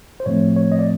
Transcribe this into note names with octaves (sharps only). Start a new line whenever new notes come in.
C5
A2 F3 A3 C4 C#5
C#5
D#5
D5